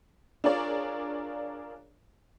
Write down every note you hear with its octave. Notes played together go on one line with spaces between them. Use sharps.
D4 F4 G#4 A#4 C#5 D5